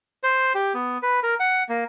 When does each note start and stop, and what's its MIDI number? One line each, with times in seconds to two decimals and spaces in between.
0.23 0.53 72
0.55 0.73 67
0.74 0.98 59
1.03 1.20 71
1.23 1.34 70
1.40 1.63 78
1.69 1.84 58